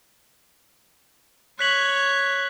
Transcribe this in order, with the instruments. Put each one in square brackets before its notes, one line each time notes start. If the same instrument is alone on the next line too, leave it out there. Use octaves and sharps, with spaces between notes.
[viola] C#5 [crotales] F#6 B6 F#7